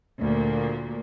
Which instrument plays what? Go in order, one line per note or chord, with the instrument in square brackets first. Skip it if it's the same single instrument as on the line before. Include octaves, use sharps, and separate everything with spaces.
[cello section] D2 A#2 A#3